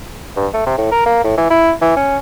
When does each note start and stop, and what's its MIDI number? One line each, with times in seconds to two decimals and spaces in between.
0.37 0.47 43
0.54 0.62 57
0.66 0.77 48
0.77 0.90 45
0.92 1.06 70
1.06 1.23 58
1.24 1.33 45
1.38 1.46 52
1.50 1.73 64
1.81 1.93 52
1.96 2.17 61